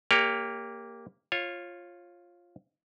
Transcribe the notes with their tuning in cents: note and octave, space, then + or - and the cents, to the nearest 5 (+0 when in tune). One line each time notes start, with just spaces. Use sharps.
A#3 -5 G4 +20 C#5 +30
F4 +0 C#5 -25